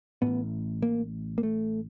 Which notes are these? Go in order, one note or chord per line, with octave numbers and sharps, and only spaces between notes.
A1 A2 B3
A#3
A#3
A3